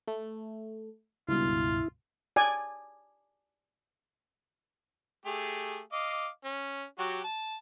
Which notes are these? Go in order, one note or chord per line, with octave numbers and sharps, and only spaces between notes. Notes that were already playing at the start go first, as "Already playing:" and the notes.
A3
C#2 G2 B2 E4 F4
D5 G#5
A3 G4 G#4
D#5 F5 D6
C#4
F#3 F#4 G4
A5